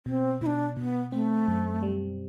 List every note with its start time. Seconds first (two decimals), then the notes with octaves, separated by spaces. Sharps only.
0.06 B2 C4
0.41 B2 E4
0.46 D4
0.77 B2 B3
1.12 A3 C4
1.48 F#2
1.83 G3